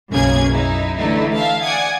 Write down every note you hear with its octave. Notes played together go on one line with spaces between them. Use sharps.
B1 F#2 C#3 A#3 G#4 G#6
F#2 D#4 E4
D3 E3 A3 D#4 E4
E5 F5 A5
D5 F#5 G#5 D#6 G#6